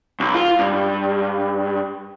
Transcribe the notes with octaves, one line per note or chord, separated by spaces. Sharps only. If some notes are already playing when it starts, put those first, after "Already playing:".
B1
F4
G2